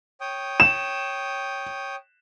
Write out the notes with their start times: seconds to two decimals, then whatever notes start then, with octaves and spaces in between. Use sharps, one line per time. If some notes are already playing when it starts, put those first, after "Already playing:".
0.21 C#5 G5 D#6
0.60 E7